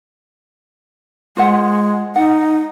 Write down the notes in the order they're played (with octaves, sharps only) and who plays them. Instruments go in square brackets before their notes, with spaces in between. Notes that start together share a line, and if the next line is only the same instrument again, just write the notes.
[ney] G#3 [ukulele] F4 C5 F#5
[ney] D#4 [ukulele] F#5